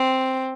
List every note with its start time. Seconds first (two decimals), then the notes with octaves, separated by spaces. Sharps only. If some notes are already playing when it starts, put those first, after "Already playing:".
Already playing: C4